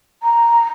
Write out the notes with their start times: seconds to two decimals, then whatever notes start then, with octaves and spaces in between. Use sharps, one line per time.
0.23 A#5